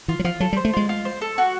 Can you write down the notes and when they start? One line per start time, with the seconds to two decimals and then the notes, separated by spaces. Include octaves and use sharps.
0.08 E3 F4
0.19 F#3
0.24 F3 F4
0.40 F#3 A4
0.53 G3
0.57 C5
0.65 A3
0.73 G#3 F4
0.89 F4
1.05 C5
1.21 A4
1.38 F#4